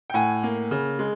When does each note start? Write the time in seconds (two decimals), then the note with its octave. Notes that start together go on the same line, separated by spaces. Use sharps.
0.10 G5
0.14 A2 F#5 G#5
0.43 A#3
0.71 C#3
0.99 G#3